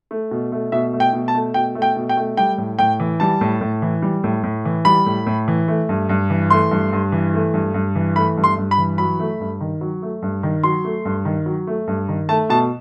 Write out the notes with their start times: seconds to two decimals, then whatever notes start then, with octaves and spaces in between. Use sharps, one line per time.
0.11 A3
0.31 B2
0.52 A3
0.72 B2 E5
0.93 A3
1.00 G5
1.13 B2
1.28 A5
1.34 A3
1.54 B2 G5
1.75 A3
1.82 G5
1.96 B2
2.09 G5
2.17 A3
2.37 G3 G5
2.58 A2
2.79 A2 G5
3.00 E3
3.20 G3 A5
3.41 A2
3.61 A2
3.82 E3
4.02 G3
4.24 A2
4.44 A2
4.65 E3
4.85 G3 B5
5.06 A2
5.26 A2
5.48 E3
5.68 A3
5.89 G2
6.09 G2
6.30 E3
6.50 A3 C6
6.71 G2
6.93 G2
7.12 E3
7.34 A3
7.54 G2
7.74 G2
7.95 E3
8.16 A3 B5
8.37 G2
8.44 C6
8.57 G2
8.71 B5
8.78 E3
8.98 F#3 B5
9.19 A3
9.40 G2
9.60 D#3
9.81 F#3
10.02 A3
10.22 G2
10.43 D#3
10.64 F#3 C6
10.85 A3
11.05 G2
11.25 D#3
11.46 F#3
11.67 A3
11.87 G2
12.08 D#3
12.29 A3 A5
12.49 B2 A5